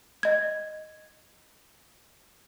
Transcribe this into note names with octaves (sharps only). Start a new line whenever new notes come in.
D#5 G#6